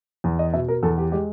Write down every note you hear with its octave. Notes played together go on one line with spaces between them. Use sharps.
E2
D#5
B2 E5
A#4
E2 A4
G4
G#3 G4